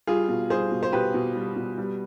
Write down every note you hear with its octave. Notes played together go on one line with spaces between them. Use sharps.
G3 F4 G#4
B2
G3 G#4 C5
B2
C5
B2 G4 B4
B2
G3
B2
G3